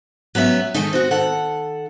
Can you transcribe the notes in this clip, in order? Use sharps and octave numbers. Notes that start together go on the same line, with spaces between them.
F#3 B3 C#4 E5
D#3 G#3 A3 D#4
C4 F#4
D#3 A4 F#5